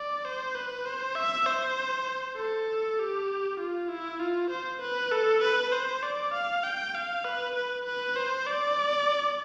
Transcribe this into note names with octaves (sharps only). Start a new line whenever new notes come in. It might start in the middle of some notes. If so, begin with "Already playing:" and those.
Already playing: D5
C5
B4
C5
E5
C5
A4
G4
F4
E4
F4
C5
B4
A4
B4
C5
D5
F5
G5
F5
B4
B4
B4
C5
D5